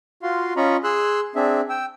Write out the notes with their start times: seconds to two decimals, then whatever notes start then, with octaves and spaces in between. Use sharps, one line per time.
0.23 F4 F#4 F5 C6
0.56 C#4 F4 D#5 A#5 B5 C#6
0.84 G#4 C6 E6 F#6
1.36 C4 D4 G#4 E5
1.70 G5 E6